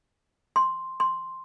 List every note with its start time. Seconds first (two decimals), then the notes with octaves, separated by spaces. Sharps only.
0.56 C6
1.00 C6